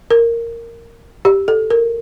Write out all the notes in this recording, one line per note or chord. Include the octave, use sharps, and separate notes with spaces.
A#4
G4
A4
A#4